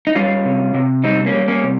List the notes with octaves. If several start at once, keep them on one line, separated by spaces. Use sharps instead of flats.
D#4
G3 C#4 F4
C3
C3
G3 C4 D#4
A#3 C#4
G3
A#3 C#4
C3